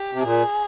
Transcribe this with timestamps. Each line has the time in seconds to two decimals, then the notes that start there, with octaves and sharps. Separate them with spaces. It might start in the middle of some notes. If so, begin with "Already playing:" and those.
Already playing: G4
0.13 C3
0.23 A#2 G#4